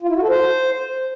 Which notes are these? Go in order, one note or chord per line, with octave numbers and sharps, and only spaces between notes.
F4
E4
F#4
A4
C5